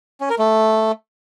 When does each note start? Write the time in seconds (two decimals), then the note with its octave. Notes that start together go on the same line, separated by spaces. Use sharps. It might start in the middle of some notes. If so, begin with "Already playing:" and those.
0.21 C#4
0.30 A#4
0.39 A3